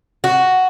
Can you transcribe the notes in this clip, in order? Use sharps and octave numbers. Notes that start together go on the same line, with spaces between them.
F#4